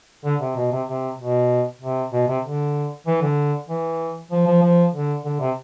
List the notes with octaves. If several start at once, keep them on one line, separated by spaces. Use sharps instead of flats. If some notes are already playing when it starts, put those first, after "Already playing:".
D3
C3
B2
C3
C3
B2
C3
B2
C3
D3
E3
D3
E3
F3
F3
F3
D3
D3
C3